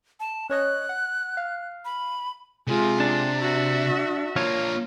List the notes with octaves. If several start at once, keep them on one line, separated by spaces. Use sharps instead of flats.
A5
C#4 C#5 D#5 F#6
F#5
F5
B5
C3 G#3 F4
D4
F#4 E5
A#3 D4 F4 C#5